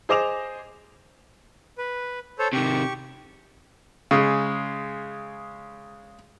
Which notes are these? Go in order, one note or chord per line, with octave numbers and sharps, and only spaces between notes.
G#4 C5 D#5 D6 E7 F7
B4
A4 C5 C#5
C3 D#3 G4 C#6
C#3 G#3